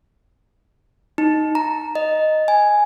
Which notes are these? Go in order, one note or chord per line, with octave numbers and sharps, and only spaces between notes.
D#4
A#5
D#5
G#5